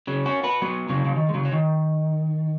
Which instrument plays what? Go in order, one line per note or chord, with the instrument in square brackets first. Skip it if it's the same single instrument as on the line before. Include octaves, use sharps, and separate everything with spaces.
[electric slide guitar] C#3 F#3
C#4 F#4
F#4 B4
F#3 B3
C#3 F#3
C#3
D#3
G#3
C#3 F#3
F#3
D#3